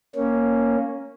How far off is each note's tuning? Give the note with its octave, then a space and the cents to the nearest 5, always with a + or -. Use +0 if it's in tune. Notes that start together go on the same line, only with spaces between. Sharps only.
A#3 +0 C#4 +0